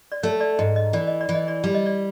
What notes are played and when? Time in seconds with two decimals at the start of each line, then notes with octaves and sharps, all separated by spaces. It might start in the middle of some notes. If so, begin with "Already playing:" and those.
0.12 D5
0.23 A3 C#5
0.40 D5
0.59 G#2 D#5
0.76 D#5
0.93 E3 D5
1.07 D#5
1.21 D5
1.29 E3
1.35 D#5
1.48 D5
1.64 G3 D5
1.74 D#5
1.86 D5